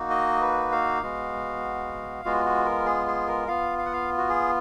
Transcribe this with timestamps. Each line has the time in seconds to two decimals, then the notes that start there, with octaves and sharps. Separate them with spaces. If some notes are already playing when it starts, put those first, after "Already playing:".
Already playing: A#3 D#4 F#4
0.10 D#5
0.41 B4
0.72 F5
1.02 G#3 B3 F#4
2.25 G#3 B3 F4 F#4
2.45 F#4
2.65 A#4
2.86 G#4
3.07 G#4
3.27 A#4
3.48 B3 F4 F5
3.78 F5
3.86 F#5
3.93 F5
4.18 F#4
4.29 G#4